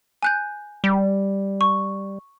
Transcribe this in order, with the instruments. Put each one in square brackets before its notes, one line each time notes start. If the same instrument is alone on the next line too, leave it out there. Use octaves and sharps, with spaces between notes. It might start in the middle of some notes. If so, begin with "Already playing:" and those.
[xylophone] G#5 F#6 G6
[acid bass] G3
[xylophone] C#6